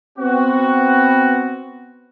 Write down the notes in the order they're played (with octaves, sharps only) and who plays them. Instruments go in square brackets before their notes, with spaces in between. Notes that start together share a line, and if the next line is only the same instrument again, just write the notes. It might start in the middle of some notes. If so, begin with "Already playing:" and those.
[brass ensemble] B3 C4 F#4